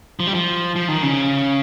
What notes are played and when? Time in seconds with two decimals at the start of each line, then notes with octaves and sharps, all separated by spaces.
0.20 F3
0.27 G3
0.34 F3
0.76 F3
0.88 D#3
1.02 C#3